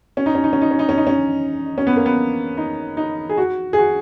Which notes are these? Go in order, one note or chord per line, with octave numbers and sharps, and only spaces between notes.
C#4
D#4
C#4
D#4
C#4
D#4
C#4
D#4
C#4
D#4
C#4
C#4
B3
A#3
B3
D#4
D#4
G#4
F#4
G#4
F#4